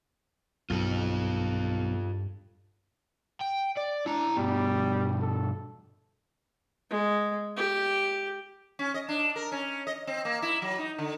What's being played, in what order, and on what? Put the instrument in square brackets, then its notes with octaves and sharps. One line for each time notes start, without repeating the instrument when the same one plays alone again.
[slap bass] B1 [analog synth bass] G2 [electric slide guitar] F4 A4
[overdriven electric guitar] G5
D5
[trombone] D4 [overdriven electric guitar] E4 A#5
[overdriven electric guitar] G2 B2 [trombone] G3
[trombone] A4
[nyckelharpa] G#3
G4
[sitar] C#4
D#5
D4
A#4
C#4
D#5
C4
A#3
E4
F#3
D#4
D3